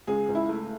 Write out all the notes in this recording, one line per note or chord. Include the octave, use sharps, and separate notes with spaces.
C#2 G#4
C#2
E4
A3